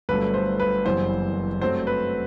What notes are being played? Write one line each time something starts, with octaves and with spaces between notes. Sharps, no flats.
G1 G2 F#3 A3 B4
C5
B4
F#1 F#2 E3 G3 B3 C5
G2 F#3 A3 C4 C5
B4